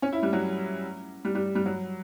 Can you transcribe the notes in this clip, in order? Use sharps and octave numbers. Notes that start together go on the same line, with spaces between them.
C#4
E4
G3
F#3
G3
G3
G3
F#3